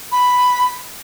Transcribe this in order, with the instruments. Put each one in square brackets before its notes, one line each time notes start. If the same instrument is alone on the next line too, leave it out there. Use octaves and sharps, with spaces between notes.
[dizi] B5